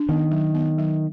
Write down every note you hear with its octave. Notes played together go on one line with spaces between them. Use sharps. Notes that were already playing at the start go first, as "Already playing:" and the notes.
Already playing: D4
D#3 B3
F#3
B3
F#3